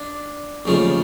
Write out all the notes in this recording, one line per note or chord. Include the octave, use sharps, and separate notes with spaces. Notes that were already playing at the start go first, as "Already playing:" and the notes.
Already playing: D4
D#2 C#3 F3 A3